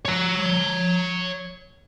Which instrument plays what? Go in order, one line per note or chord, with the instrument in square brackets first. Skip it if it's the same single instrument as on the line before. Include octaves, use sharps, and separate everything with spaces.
[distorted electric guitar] C#5 A#5